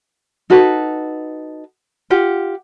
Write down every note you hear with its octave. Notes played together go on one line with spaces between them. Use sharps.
D#4 F#4 A4 B4
F4 G4 F#5